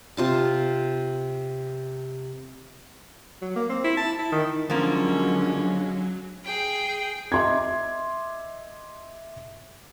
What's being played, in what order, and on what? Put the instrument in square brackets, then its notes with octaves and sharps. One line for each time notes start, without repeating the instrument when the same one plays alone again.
[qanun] C3 F4 A5
[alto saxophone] F#3
A#3
C4
E4
A5
E4
D#3
[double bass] D3 G#3 [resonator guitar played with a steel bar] F3 A#3 [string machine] F#3 [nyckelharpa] C#4
[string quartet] G#4 G5
[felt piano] D#5 E5 C6 D6 G#6